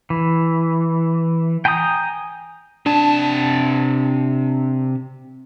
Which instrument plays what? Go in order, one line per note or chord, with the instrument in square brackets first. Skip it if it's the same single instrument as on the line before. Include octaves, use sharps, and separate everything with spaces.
[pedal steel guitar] E3
G5 G#5 A#5 B5 D#6
[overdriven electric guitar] C3 A5 [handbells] D4